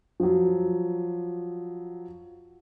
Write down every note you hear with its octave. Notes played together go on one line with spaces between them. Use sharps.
F3 F#3